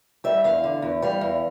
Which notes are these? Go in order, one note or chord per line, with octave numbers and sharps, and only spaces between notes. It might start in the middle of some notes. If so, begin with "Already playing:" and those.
G3 E5
E2 F5
D3
E2
G3 F5
E2